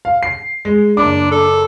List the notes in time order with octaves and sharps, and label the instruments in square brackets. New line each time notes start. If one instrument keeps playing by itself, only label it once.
[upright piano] F5
C7
G#3
[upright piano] F#1 D6 [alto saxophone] D4
[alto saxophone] A4